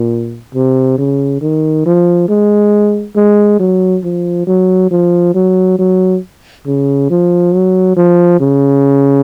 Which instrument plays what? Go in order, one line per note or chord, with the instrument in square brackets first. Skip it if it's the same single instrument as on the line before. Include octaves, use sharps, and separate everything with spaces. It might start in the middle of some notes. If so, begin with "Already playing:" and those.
Already playing: [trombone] A#2
C3
C#3
D#3
F3
G#3
G#3
F#3
F3
F#3
F3
F#3
F#3
C#3
F3
F#3
F3
C#3